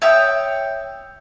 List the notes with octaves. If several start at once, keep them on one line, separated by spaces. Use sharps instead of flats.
C#5 E5 G5 D#6